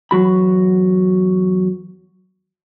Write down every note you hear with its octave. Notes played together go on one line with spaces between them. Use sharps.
E2 F#3 F#4 B5